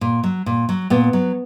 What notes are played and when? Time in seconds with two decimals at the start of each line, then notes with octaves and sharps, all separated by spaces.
0.01 A#2
0.23 F#3
0.46 A#2
0.69 F#3
0.90 A#2 B3
1.13 F#3